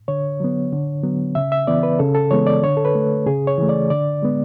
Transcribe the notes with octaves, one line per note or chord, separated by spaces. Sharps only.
D3 C#5
F#3 B3
D3
F#3 B3
C#3 E5
E5
E3 B3 D5
B4
C#3 A4
A4
E3 G#3 B3 C#5
D5
D3 C#5
A4
B4
A3
C#3 G#4
C#5
E3 A3
D5
D3 D5
G#3 B3